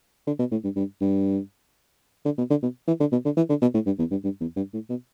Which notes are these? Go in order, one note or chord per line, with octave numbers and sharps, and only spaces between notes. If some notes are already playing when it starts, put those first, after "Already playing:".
D3
B2
A2
G2
G2
G2
D3
B2
D3
B2
E3
D3
B2
D3
E3
D3
B2
A2
G2
E2
G2
G2
E2
G2
A2
B2